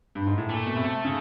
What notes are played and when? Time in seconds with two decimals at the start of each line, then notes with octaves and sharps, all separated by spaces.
0.15 G2
0.26 G#2
0.38 A2
0.49 A#2 A3
0.66 B2
0.77 C3
1.05 C#3